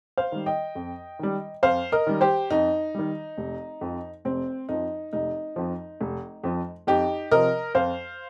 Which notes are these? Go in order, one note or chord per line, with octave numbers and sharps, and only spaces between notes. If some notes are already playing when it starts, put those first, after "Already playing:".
C5 F5
D#3 G3
D#5 G5
F2
D#3 G3
F2 C5 F5
A#4 D#5
D#3 G3
G4 C5
F2 D#4
D#3 G3
F1
F2 F3
F1 C4
F2 F3 D#4
F1 D#4
F2 F3
F1
F2 F3
F2 D#4 G4
C3 F3 A#4 D#5
F2 C5 F5